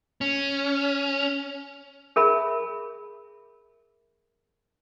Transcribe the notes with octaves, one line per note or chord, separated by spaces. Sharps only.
C#4
G#4 A#4 E5 B5